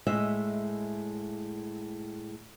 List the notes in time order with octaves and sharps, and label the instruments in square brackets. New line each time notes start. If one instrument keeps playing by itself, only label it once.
[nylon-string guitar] A2 G#3 D#5 E5